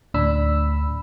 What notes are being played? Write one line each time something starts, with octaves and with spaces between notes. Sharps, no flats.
D2 A2 D4 B5 E6